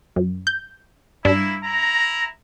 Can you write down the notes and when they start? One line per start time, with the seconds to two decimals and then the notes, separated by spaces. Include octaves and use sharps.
0.16 F#2
0.47 G6
1.25 G2 A#3 D4 E4
1.64 E4 A#5